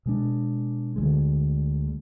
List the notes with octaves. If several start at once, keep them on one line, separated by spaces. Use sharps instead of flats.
B2 G#3 D4
D2 D3 F3 G#3